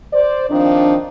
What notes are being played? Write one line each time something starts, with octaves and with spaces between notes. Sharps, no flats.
C5 D5
D#3 F3 C4 D4